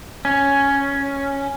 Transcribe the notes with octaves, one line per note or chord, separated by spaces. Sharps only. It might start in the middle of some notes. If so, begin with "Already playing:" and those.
C#4